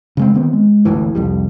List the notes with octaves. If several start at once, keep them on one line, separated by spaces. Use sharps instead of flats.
C#3 G#3 C4
D#3 B3 C4
G#3
G1 D2 A2 E3
C2 F2 G3